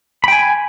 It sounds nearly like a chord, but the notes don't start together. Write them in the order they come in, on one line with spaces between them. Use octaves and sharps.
B5 G5 G#5